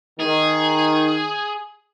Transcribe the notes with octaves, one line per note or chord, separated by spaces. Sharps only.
D#3 D#4 G#4